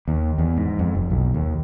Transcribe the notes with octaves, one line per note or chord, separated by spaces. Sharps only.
D#2
E2
G#2
F2
F1
B1
D#2